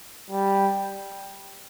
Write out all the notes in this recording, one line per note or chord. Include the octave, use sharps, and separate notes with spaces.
G3